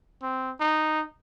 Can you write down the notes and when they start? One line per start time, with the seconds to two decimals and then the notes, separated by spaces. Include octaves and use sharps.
0.22 C4
0.60 D#4